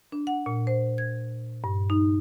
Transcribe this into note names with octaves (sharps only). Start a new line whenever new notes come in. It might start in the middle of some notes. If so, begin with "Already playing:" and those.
D4
F#5
A#2
C5
G#6
G2
D#4